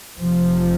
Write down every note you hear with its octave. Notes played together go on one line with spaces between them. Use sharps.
F1 F2 C3 F3